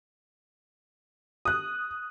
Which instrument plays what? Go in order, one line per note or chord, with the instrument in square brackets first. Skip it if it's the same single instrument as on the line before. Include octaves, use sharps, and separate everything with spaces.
[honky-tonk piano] D#6 F#6